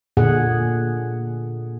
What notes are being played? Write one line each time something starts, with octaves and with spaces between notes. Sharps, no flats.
A#2 D3 G#4 F#5